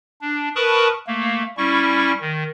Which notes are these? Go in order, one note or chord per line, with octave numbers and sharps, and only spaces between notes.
D4
A#4 B4 A5 B5 C#6 D#6
A3 A#3
G3 C#4 E4 C#6
D#3